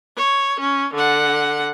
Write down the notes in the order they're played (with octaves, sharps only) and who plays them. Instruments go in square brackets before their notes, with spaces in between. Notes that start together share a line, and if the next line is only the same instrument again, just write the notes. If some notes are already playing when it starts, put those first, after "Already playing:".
[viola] C#5
C#4
D3 F#5